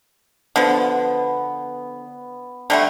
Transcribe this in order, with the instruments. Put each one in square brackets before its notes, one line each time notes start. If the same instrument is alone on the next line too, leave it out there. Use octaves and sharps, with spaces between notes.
[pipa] D3 F3 [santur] B3
[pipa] D3 G3 A3